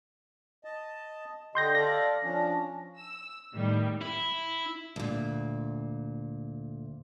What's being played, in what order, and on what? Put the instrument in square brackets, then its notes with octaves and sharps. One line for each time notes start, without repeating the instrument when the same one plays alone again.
[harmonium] D#5 A5
[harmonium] D3 G4 D#5 [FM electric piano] C6 G6 A#6
[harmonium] A4 D5 F5 [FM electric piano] A#6
[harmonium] F3 C#4 D4
[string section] E6
A2 D#3 G3
[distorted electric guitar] E4
[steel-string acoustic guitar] D2 A#2